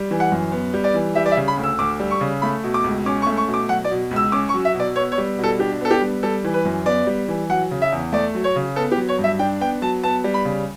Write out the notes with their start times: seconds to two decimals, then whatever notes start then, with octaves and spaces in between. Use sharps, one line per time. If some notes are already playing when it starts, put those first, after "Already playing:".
Already playing: G3
0.11 E3
0.20 F#5
0.32 F#2
0.52 B3
0.74 G3
0.84 D5
0.94 E3
1.15 G3 E5
1.26 D5
1.32 E5
1.37 C#3
1.48 B5
1.57 D2
1.63 E6
1.79 D2 D6
2.00 G3
2.11 C#6
2.21 C#3
2.42 A3 B5
2.64 B2
2.74 D6
2.84 C#2
3.06 C#4 D6
3.22 C#6
3.27 A3
3.37 C#6
3.48 B2
3.54 D6
3.69 F#3 F#5
3.85 D5
3.91 B2
4.11 C#2
4.16 E6
4.32 C#4 D6
4.49 C#6
4.54 F#3
4.65 E5
4.74 B2
4.80 D5
4.96 B3 C#5
5.12 C#5
5.18 G3
5.38 B2
5.44 A4
5.59 D4 G4
5.81 B3 A4
5.91 G4
6.01 G3
6.23 G3 A4
6.44 E3
6.54 B4
6.65 F#2
6.86 B3 D5
7.07 G3
7.28 E3
7.50 F#3 F#5
7.71 C#3
7.82 E5
7.92 E2
8.12 A3 D5
8.35 F#3
8.44 C#5
8.56 C#3
8.76 B3 A4
8.92 G4
8.98 F#3
9.09 C#5
9.19 G2
9.24 E5
9.39 D4 G5
9.60 B3 G5
9.82 F#3 A5
10.03 B3 A5
10.24 G3
10.34 B5
10.45 C#3